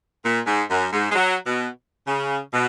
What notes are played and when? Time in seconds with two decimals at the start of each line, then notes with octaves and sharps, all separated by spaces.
0.24 A#2
0.47 G#2
0.70 F#2
0.92 G#2
1.11 G#3
1.15 F#3
1.46 B2
2.07 C#3
2.53 B2